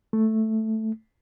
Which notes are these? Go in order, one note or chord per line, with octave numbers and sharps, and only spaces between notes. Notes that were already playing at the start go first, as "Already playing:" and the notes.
A3